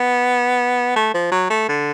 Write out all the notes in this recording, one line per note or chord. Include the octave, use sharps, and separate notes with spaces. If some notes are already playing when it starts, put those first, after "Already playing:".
Already playing: B3
A3
F3
F#3
A3
D3